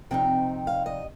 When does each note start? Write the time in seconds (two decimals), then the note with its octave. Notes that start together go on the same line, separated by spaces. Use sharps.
0.11 C3 F3 C4 D#4 G5
0.67 F5
0.86 D#5